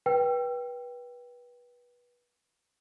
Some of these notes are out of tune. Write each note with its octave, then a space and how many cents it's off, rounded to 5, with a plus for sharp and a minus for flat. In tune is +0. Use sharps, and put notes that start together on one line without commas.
B4 -25 G5 +0 E6 +35